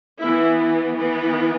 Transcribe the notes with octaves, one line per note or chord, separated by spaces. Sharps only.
E3 B3 E4
E3 B3